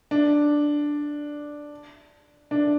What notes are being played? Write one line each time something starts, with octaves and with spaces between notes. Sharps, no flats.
D4
D4